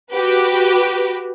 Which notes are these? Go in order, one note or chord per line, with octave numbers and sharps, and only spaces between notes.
F#4 G4 B4